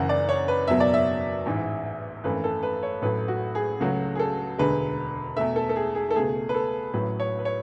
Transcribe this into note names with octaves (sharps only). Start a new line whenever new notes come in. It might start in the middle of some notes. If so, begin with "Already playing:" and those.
Already playing: F#1 F#2 C#3 E3 F#5
D5
C#5
B4
F#1 E2 B2 F#3 E5
D5
E5
A1 G#2 E3
G#1 F#2 E3 A3 B4
A4
B4
C#5
A1 A2 F#3 A3 B4
F#4
G#4
C#2 C#3 F#3 A3 F#4
G#4
A4
E1 D2 D3 G#3 B4
E2 B2 A3 E5
A4
A4
G#4
G#4
A4
C#2 B2 A3 G#4
B4
A4
A1 A2 F#3 B4
C#5
B4
C#5